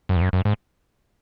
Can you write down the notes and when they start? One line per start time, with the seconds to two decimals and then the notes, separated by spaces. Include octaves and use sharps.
0.09 F#2
0.16 E2
0.21 F#2
0.33 F#2
0.45 G#2